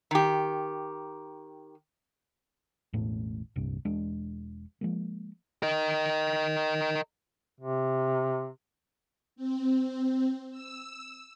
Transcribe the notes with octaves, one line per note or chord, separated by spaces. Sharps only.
D#3 G4
E1 A1 A2
D#1 C2 G2
E1 G#3 D4
F3 G#3 A#3
A#4 D#5
C3
C4
E6